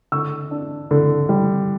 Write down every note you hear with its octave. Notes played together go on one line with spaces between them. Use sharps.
D3 C#6 E6
D4
D3
G3